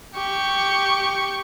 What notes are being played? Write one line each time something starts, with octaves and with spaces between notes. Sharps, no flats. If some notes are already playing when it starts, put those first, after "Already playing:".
G4 C#6